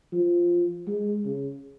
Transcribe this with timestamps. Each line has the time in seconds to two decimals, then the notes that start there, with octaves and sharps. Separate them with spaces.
0.12 F3
0.87 G#3
1.25 C#3